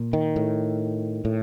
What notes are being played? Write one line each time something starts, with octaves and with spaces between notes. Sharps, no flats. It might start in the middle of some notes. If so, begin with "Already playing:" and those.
Already playing: A#2
D#3
A2
A2